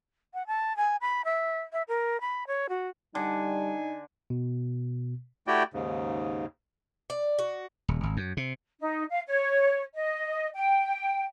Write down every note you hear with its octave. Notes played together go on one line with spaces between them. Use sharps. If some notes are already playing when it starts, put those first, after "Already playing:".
F#5
A5
G#5
B5
E5
E5
A#4
B5
C#5
F#4
D3 G3 D#4 G#5
B2
A3 E4 F#4 G4 D5 G5
D#2 G#2 C#3
D5
F#4
D#1
G#1
F#2
C3
D#4
F5
C#5
D#5
G5